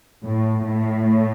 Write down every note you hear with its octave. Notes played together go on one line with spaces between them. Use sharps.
A2
A2